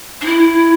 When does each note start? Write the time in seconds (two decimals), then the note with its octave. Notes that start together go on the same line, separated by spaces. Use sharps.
0.21 D4
0.25 E4